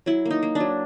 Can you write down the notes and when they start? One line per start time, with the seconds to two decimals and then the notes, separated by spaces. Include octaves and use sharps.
0.06 F#3 E4
0.25 A#3
0.31 D#4
0.43 A#3
0.55 F#3 D4